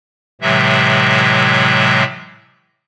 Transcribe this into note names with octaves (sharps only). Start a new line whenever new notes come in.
A2 C3 E3 F#3 G#3 E5